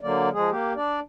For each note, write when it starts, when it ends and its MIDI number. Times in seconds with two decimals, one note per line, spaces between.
0.01 0.29 50
0.01 0.29 54
0.01 0.29 58
0.01 0.29 74
0.33 0.50 53
0.33 0.50 56
0.33 0.50 68
0.50 0.73 58
0.50 0.73 67
0.76 1.00 62
0.76 1.00 74